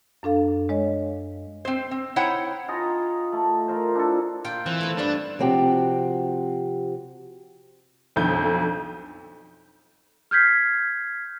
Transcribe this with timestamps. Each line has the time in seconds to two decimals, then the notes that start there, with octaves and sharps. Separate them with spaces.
0.23 F#2 D4 A4 F5
0.69 G#3 C#5 D#5
1.65 C4 C5
1.91 C4
2.16 D#4 E4 C5 C#5 F#5 G5
2.68 F4 G#4 D#5 A#5
3.32 A3
3.68 F4 A#4 C5
3.95 D4 E4 F4 A4
4.44 A#2 F4 G5
4.66 E3 C4
4.80 A3 B3
4.98 G2 G3 D4
5.39 C3 F3 C4 F#4 G4
8.16 B1 F2 D3 G6
10.31 F6 G6 G#6 B6 C7